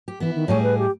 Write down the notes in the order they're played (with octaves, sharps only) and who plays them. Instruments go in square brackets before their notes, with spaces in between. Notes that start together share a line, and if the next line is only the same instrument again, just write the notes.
[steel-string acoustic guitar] G4
[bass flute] E3 [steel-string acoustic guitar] B3 E4
[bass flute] D#3
[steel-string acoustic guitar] A2 G3 G#4 [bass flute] C#5
[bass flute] B4
G4